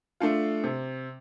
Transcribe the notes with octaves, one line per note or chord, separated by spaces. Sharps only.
A3 D4 F4
C3